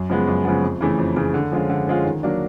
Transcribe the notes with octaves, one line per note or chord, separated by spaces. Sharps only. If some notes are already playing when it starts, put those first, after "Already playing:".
Already playing: F#2
C#3 F3 G#3 B3
F#2
C#3 F3 G#3 B3
F2
C#3 E3 A3
F2
C#3 E3 A3
D3
F3 G#3 C#4 F4
D3
F3 G#3 C#4 F4
D#3
F#3 A#3 D4